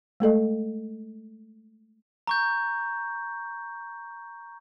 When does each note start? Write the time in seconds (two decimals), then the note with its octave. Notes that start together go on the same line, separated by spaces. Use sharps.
0.20 G#3 A3 A4 D#5
2.27 A#5 C#6 G6